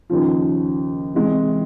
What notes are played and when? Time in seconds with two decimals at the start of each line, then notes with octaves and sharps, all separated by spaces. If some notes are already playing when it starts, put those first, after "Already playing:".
0.09 D#2 C#3 F3
1.15 C3 E3 G#3